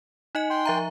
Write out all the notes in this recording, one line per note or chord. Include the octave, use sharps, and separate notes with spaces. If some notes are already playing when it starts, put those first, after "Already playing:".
D#4 D#5 G#5
G5 C6
F3 E5 A#5